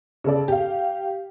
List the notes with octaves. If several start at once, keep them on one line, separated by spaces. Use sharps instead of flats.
C#3 A4 D5
G4 F5